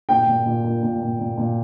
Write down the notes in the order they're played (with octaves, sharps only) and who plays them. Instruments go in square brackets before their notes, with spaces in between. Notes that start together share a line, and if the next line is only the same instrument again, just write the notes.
[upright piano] A#2 G5
A#2
A#2
A#2
A#2
A#2
A#2
A#2